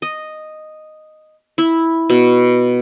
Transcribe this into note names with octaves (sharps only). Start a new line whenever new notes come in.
D#5
E4
B2